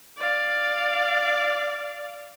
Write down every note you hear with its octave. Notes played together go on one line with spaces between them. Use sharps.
D5 F5